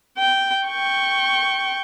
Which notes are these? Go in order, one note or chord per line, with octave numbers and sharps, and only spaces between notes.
G5
G5 C#6